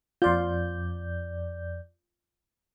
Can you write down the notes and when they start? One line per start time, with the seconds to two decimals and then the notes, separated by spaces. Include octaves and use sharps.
0.22 F2 F4 D5 G6